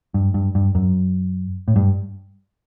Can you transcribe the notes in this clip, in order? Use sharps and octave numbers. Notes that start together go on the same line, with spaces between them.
G2
G2
G2
F#2
A2
G2